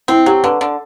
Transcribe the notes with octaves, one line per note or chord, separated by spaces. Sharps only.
C4 E4
F#3 G4
D3 B4
D3